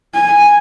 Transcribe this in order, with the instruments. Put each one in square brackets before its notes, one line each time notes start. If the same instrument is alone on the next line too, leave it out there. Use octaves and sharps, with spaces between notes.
[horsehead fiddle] G#5